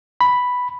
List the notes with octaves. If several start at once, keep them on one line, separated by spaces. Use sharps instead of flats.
B5